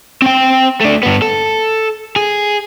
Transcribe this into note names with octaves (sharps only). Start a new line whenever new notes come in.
C4 G5
A3 D4
G2 B3
A4
G#4